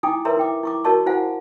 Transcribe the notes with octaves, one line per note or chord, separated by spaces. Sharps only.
D#4 E4 G5 G#5 D6 D#6
A#4 B4 C#5 E5 A#5 C6
E4 G5 D6
E4 C#6 D6
F#4 A#4 C#5 D#5 A5 C#6
E4 F#4 C5 F5 F#5 G#5